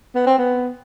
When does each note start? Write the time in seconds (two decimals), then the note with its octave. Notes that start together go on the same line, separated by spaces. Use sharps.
0.15 B3
0.27 C4
0.38 B3